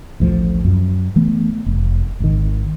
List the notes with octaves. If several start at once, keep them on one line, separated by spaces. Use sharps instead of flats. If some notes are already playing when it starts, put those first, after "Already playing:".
A1 D2 A2 F3
F#2
E3 A3 B3
F1
G#1 D#3